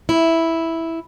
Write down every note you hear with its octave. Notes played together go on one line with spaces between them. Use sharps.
E4